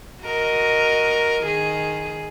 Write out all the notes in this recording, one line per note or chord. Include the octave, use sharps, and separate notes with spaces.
F#4 A#4 D#5
D#3 G#4